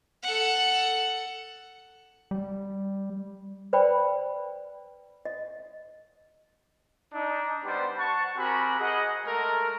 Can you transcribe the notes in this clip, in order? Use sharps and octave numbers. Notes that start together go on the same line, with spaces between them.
A4 F#5
G3
B4 C5 D5 G5 B5
D#5
D4 D#4
G3 B3 C5
F#5 A5 C#6
C4 F#4 G4 A#4 G#5 B5
G#4 D#5 F#5
G#3 A3 A4 A#4